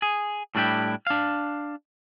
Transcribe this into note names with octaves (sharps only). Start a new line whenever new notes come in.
G#4
A2 G3 D4 E4 F4 G4
D4 F5